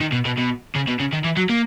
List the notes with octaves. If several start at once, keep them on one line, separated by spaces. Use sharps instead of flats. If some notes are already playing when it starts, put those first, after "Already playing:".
D#3
B2
B2
B2
C#3
B2
C#3
D#3
E3
F#3
A#3